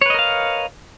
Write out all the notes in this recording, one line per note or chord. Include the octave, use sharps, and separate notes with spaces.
A#4 B4 C#5 D#5 F5